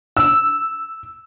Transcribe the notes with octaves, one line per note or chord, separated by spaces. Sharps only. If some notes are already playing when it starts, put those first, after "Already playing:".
E6